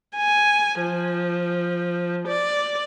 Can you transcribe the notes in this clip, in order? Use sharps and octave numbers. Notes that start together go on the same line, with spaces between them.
G#5
F3
D5